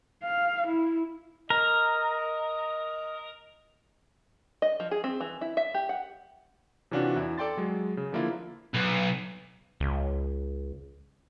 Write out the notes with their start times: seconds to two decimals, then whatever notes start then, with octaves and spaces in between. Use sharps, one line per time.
0.23 F5
0.67 E4
1.50 A#4 D#5
4.62 D#5
4.80 F3
4.91 G#4
5.04 C4
5.21 E3
5.41 E4
5.57 E5
5.74 G4
5.89 F#5
6.91 C3 E3 C#4 D4 F4 F#4
7.16 E2 E4
7.38 A4 D5 G5 C6 A6
7.57 F#3 G#3
7.97 C#3
8.12 D3 F3 A#3 E4 F4
8.74 B1
9.80 C#2